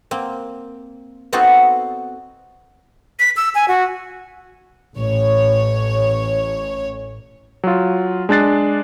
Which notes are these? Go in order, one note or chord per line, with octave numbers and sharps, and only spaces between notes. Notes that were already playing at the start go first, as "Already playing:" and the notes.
A#3 C4
B3 C4 D#4 F#4 A4 C5
B6
E6
G#5
F#4
A1 C#5
F#3 F4
G#3 D4 F#6 A6 C7